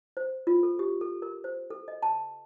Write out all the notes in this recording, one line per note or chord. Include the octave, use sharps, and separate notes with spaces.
C5
F4
A4
G4
A4
A#4
C5
A4
D#5
A5